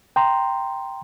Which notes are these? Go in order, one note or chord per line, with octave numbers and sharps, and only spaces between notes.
G5 A#5 C6